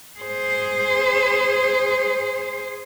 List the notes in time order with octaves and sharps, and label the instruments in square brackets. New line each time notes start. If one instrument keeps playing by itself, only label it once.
[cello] G#4 C5